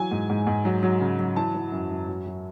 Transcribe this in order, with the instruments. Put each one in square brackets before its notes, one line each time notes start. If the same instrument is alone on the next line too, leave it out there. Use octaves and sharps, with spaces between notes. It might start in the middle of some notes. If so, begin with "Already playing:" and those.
Already playing: [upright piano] E3 F#3 G#5
G#2
G#2
G#2
F#3
F#3
C#3
F#3
E3 A5
E3
F#2
F#2
F#3
F#3